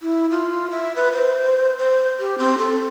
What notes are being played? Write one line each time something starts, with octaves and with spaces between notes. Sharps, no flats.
E4
F4
E5
B4
C5
C5
G4
C4
A4